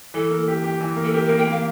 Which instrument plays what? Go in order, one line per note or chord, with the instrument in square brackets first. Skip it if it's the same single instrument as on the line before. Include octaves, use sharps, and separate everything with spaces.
[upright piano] E3 [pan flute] A4
[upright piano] A#3
G4
G4
E3
A#3
[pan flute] A4
[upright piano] G4 [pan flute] A#4
[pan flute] A#4
[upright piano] A#3
[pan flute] G5
[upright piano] A#3 [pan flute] F5